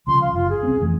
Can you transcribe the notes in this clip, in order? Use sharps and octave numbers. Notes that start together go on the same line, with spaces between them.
C2 C#3 F3 C6
F5
F#1 F4
G#4
C2 C4 C#4
F2 E3 A3